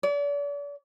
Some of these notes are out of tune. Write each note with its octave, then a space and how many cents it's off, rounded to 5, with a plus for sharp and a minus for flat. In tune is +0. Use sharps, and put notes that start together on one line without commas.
D5 -40